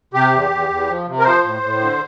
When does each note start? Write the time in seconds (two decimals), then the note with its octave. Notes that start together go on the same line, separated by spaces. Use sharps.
0.14 C3 G4
0.32 E2
0.51 E2
0.69 E2
0.88 F3
1.07 C3
1.19 A#4
1.25 F3 C5
1.43 A2
1.62 A2
1.80 D3